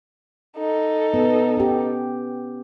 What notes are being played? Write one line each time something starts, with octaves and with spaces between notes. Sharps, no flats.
D#4 A4
B3
C#4 G4